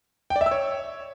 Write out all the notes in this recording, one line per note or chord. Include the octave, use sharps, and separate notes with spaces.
G5
D5
E5
E6
C#5